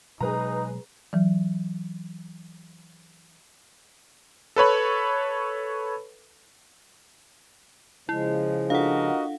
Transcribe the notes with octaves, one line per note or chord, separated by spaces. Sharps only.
B2 F#3 G#3 D#4 G#4 B4 A#5
E3 F#3
A4 B4 C#5 B5
C#3 F3 G#3 E4
D4 F4 F#4 A4 A#4 D#5 F5 F#5